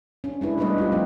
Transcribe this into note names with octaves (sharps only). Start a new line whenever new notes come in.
C#4 D4
G#3 D4 E4 B4
G3 A3 B3 D4 B4 D#5
D#4 F4 G4
F3 A3 C4 D#4